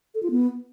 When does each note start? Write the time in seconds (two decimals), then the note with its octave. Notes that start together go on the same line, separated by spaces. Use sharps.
0.15 A4
0.23 F4
0.31 B3